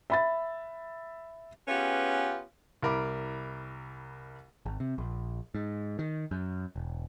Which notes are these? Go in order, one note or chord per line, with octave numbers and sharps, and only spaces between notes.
E5 B5 A6
B3 C#4 F4 G4 G#4 B4
C2 E4 A#4 B5 D6
G#1
C3
A#1
G#2
D#3
F#2
E1